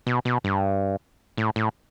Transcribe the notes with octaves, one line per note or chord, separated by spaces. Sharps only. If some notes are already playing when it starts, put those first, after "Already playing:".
B2
B2
G2
A2
A2